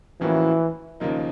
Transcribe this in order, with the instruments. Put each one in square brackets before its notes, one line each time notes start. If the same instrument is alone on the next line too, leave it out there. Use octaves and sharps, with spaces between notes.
[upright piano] A2 F3 A#3 C#4 F#4 [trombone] E3
[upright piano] D#2 C#3 F3 A#3 D#4